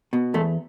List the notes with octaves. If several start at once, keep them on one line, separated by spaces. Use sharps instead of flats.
B2
E2 A3